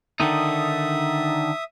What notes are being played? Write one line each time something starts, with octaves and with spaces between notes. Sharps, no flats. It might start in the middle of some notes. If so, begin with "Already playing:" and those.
D3 D#3 D#4 E5 D#6